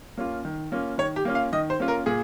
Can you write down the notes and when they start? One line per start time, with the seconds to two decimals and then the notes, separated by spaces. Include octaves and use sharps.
0.18 A#3 C#4 F4
0.45 D#3
0.72 A#3 C#4 F4
0.98 D#3 C#5
1.16 G4
1.25 A#3 C#4 F4
1.35 F5
1.52 D#3 D#5
1.70 C5
1.80 A#3 C#4 F4
1.88 A#4
2.06 A#2 G#4